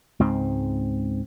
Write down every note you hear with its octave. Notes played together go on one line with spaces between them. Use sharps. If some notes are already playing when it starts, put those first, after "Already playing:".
C#2 G#2 C4